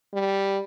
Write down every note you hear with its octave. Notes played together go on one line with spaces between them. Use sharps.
G3